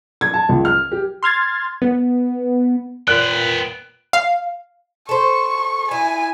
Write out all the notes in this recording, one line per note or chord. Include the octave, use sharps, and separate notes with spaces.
G#6
A5
C#2
F6
G4
C6 F6 G#6 A6
B3
A#2 B3 G5 F#6
F5
A4 C5 C#6
E4 G#5